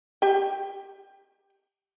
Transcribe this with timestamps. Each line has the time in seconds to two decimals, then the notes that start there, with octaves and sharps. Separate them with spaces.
0.22 G4 G5